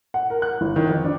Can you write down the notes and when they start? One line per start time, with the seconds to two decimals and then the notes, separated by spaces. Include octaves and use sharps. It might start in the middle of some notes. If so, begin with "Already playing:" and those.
0.14 F#5
0.30 A#4
0.42 F#6
0.61 G1
0.76 D#3
0.89 F2
1.04 D4